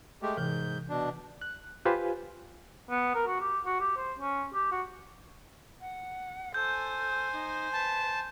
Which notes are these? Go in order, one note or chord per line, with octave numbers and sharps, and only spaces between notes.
G#3 A3 G4
G#2 C3 E3 G6
B2 D4
F#6
F4 G4 B4 C5 G#5
B3
A#4
F#4
G4
F#4
G4
C5
C#4
G4
F#4
F#5
A4 C5 G#5 G6
D#4
B4 A5